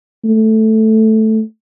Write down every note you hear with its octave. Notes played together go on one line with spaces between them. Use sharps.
A3